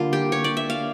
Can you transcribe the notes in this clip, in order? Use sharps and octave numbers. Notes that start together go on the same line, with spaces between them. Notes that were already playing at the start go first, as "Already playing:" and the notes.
Already playing: D3 G3 A#3 F4
G4
C#5
D5
E5
F5